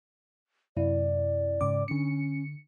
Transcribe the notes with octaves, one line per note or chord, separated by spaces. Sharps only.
F#2 C3 E4 D5
G#2 C#3 D6
D3 C#4 C#7